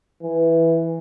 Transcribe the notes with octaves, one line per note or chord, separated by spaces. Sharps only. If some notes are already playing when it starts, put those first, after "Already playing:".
E3